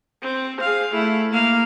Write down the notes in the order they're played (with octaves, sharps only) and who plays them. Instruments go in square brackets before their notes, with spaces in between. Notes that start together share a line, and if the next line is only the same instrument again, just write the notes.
[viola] C4
G#4 F5
A3 E4
A#3 F5